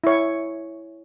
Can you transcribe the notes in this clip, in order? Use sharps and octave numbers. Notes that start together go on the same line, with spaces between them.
E4 C#5